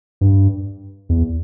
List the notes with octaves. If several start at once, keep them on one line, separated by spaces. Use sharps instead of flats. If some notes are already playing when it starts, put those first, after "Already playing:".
G2
E2